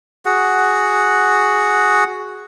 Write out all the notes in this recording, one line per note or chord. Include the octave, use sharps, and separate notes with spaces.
F#4 G#4 F#5